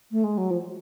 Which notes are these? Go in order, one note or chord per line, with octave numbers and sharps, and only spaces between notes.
A3
G#3
F#3
F3